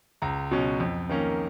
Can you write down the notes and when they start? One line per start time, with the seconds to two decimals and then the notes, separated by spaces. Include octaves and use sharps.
0.22 C#2 A#5
0.51 B2 F#3 C#4
0.80 F2
1.09 D#3 A#3 C#4